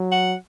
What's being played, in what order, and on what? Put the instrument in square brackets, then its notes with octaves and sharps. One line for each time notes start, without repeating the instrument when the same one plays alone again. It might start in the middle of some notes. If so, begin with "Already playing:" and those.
Already playing: [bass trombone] F#3
[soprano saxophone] F#5